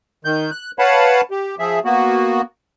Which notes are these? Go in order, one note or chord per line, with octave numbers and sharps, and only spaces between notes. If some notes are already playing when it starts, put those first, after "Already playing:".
D#3 G6
F#6
B4 C#5 F5 F#5 A5 B5
G4
F3 G#4 E5
A#3 B3 F#4